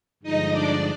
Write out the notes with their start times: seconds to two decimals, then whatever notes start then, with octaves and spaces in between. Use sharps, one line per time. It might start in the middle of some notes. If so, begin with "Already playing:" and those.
0.23 G2 D3 F3 G#3 D#4 D#5
0.51 D4 D5